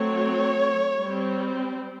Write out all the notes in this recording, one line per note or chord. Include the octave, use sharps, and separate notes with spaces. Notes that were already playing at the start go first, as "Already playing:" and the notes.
Already playing: F#3 A3 C4 C#5
G3 C4